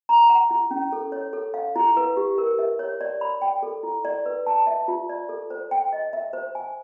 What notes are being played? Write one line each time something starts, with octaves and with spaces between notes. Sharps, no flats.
A#5
F#5
E4
C#4
A4
C#5
A4
F5
E4
B4
G4
A#4
E5
C#5
D5
B5
G5
A4
E4
D5
B4
A5
E5
F4
D5
A4
C5
G5
D#5
E5
C5
G#5